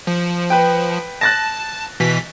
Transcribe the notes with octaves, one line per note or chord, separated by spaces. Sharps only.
F3
B4 G5
A5 F#6 A6 A#6
B2 E3 B6